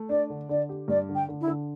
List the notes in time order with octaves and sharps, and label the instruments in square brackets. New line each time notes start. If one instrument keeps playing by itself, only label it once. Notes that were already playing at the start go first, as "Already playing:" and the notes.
Already playing: [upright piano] A3
[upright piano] D4 [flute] D5
[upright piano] D3
[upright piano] D3 [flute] D5
[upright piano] G4
[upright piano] G2 [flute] D5
[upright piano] D3
[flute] G5
[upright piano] D3
[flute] E4
[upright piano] D3